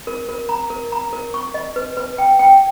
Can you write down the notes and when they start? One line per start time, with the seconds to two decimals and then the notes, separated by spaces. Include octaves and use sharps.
0.07 A#4
0.29 A#4
0.49 A#5
0.70 A#4
0.92 A#5
1.13 A#4
1.34 C#6
1.54 D#5
1.76 B4
1.97 B4
2.18 G5
2.39 G5